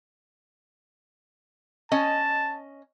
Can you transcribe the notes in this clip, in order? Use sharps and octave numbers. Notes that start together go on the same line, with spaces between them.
C#4 D#5 A5